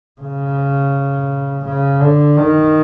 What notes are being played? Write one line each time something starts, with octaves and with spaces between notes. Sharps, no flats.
C#3
C#3
D3
D#3